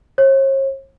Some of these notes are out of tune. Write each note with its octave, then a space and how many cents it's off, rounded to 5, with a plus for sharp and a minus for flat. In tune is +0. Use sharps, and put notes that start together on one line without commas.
C#5 -45